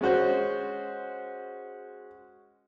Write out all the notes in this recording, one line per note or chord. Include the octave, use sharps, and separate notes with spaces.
G#3 C#4 F#4 C5